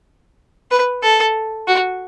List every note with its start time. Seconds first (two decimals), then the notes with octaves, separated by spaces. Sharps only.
0.71 B4
1.03 A4
1.67 F#4